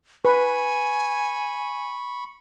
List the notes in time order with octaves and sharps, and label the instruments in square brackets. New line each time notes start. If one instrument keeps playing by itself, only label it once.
[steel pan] B4 [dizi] G#5 [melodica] B5 C#6